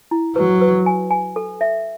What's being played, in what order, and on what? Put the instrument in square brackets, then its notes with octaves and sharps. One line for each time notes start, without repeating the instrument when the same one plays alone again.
[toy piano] E4
[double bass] F#3 [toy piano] B4
[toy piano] B4
G#5
G#5
A4
E5